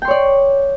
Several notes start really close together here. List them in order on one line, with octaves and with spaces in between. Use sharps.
G5 C6 C#5 D5